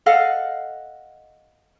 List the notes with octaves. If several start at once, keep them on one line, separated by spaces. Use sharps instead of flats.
A4 D#5 F5 F#5